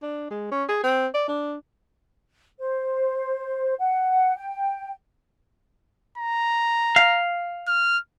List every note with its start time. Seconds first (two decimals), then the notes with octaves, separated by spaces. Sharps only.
0.02 D4
0.30 G#3
0.52 C#4
0.69 G#4
0.84 C4
1.14 D5
1.28 D4
2.59 C5
3.79 F#5
4.36 G5
6.17 A#5
6.96 F5
7.68 F6